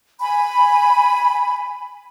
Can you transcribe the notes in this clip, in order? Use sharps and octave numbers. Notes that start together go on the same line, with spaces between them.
G#5 B5